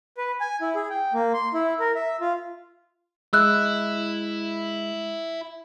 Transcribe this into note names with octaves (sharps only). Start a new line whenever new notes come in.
B4
G#5
E4
G#4
G5
A#3
C6
E4
A#4
E5
F4
G#3 E4 E6 F#6